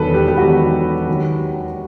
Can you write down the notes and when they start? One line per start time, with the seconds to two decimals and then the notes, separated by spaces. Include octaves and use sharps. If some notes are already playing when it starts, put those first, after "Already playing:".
Already playing: E1 E2 D#3 F#3 A4 B4
0.14 G4
0.28 G4
0.37 E1 E2 D#3 F#3 F#4
1.08 D#2 D#3 F#3